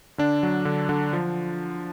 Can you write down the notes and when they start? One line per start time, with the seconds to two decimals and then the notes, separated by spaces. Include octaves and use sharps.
0.18 D3 D4
0.43 F#3
0.65 D3
0.89 D3
1.13 F3